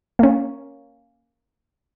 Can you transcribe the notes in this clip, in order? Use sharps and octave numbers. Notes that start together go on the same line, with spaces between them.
A#3 C#4